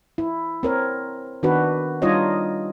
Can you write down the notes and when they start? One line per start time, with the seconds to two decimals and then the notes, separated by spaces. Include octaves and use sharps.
0.18 E4
0.63 C4 A#4 C#5
1.43 D#3 B3 D4 F#4 B4
2.02 G3 D4 D#4 F4 C#5 D#5